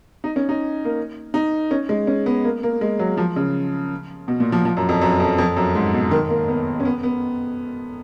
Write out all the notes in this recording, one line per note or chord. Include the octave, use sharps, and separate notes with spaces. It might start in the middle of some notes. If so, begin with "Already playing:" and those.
D#4
C#4
D#4
A#3
D#4
C#4
G#3
C#4
B3
A#3
A#3
G#3
F#3
F3
C#3
B2
A#2
F3
F3
F#2
F2
F#2
F2
F2
F#2
G#2
B2
D#3
A#3
B3
C#4
B3
B3